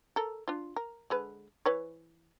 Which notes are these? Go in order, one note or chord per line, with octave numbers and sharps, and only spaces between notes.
A4 A#4
D4 F4
A#4
D3 G#3 B4
E3 B4 C#5